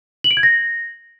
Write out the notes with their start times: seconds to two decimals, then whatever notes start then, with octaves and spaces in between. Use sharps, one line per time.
0.24 F#7
0.31 D7
0.37 G#6
0.43 A#6